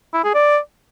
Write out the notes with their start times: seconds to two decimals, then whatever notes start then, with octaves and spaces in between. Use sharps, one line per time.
0.13 E4
0.24 G#4
0.34 D5